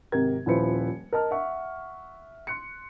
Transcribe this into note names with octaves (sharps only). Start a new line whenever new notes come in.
G#1 C3 G4 A#4 G#6
D#1 F3 E4 B4 C5 C#7
A#4 D#5 A5 F6
E5 F#5 C#6
C6 F#6 C#7